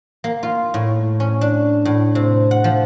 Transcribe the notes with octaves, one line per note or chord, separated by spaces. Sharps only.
A#3
F4
A2
C#4
D4
A2
C3
F#5
F3